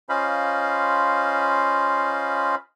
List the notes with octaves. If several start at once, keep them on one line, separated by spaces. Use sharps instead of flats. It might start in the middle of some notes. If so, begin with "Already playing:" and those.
C#4 F4 C5 D#5 F5 B5